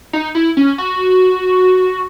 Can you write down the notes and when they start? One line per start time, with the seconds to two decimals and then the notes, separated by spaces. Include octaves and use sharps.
0.13 D#4
0.35 E4
0.57 C#4
0.78 F#4